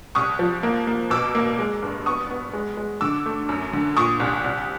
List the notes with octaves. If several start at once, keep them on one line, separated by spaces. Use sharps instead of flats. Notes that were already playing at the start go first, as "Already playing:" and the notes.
C2 C#6 D#6
F3
A#3
A#3
B2 D6 E6
A#3
G#3
G2
B3 C#6 D#6
B3
G#3
G#3
D3 D6 E6
A3
F#2
D3
A#2 C#6 D#6
C2
C2